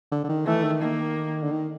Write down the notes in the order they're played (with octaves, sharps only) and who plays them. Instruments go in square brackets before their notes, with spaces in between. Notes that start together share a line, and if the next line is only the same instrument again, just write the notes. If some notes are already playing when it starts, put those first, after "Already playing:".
[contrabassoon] D3
D3
D#3
[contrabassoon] E3 [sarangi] A3
[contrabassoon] D#3
[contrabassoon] D#3 [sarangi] A#3
[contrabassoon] D3
D#3